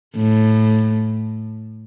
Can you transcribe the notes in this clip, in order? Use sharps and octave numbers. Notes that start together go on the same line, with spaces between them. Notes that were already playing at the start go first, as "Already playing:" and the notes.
A2